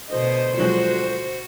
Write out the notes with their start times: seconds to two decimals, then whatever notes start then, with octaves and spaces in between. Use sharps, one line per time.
0.11 D2 B2 C5 D#5
0.58 F3 F#3 G#3 F#4